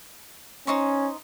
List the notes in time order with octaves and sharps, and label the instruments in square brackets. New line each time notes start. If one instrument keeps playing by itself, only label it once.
[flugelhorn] C#4 [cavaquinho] D#4 C5 C#6